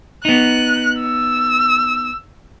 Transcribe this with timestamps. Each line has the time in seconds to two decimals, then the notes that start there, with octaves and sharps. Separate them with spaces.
0.25 B3 D#4 F#6
1.01 E6